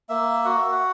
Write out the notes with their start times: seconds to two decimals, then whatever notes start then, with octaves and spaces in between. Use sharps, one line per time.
0.09 A#3 E5
0.45 F#4 F#5
0.58 E5
0.72 F#5